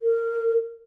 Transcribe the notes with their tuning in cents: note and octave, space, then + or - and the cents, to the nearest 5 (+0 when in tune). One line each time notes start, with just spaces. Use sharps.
A#4 -20